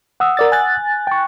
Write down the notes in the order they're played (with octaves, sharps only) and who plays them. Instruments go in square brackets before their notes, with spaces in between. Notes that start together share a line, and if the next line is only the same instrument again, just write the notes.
[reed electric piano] F#5 D#6 E6
[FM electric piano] A#4 D5 A6
G#5 F#6 A6
[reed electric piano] G5 C#6